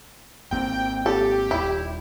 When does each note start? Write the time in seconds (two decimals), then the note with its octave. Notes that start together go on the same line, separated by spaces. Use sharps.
0.51 G#1 A#3 C4 G5
1.06 G4 A4
1.51 D#1 E4